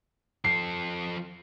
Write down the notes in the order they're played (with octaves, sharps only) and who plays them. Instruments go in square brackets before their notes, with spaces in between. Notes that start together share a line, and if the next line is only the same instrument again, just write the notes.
[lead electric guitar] F3 A4 [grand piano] C7